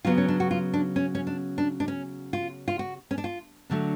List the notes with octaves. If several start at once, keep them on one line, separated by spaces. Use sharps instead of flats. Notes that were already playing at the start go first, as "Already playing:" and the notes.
C#3 F#3 B3 F4
C#4
D4
F#4
F4
D4
C#4
C#4
D4
D4
D4
C#4
F4
F4
F#4
C#4
D4
F4
D3 F#3 A3 D4